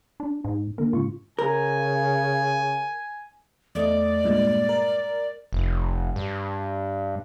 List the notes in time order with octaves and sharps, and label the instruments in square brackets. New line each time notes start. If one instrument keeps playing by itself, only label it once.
[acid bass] D4
G#2
[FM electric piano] D3 A#3 [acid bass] A#4
[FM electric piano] G#2 C#3 C#6 [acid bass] F4
[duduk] C#3 [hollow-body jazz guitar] A#4 [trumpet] G#5
[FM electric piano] E2 A3 D#5 [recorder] D5
[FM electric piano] G2 A#2 G#3
A#4
[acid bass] F1
G2